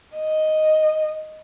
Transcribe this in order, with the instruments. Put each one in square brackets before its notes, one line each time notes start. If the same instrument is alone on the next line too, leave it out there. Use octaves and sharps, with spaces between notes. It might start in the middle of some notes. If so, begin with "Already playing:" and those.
[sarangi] D#5